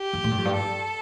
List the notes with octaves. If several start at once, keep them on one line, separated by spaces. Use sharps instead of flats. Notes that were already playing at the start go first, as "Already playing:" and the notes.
Already playing: G4
F2
A2
G2
F2
G2
A4